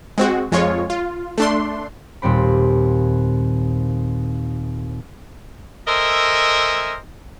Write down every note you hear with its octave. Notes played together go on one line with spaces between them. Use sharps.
G#3 C4 F#4
F2 G#3 F4 C#5
F4
A3 D4 C6
D#2 A#2 G3 C4 B5
A4 A#4 C5 D#5 E5 G#5